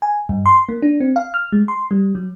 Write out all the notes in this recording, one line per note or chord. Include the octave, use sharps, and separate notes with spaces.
G#5
G2
C6
A#3
D4
C4
F5
F6
G#3
C6
G3
F#3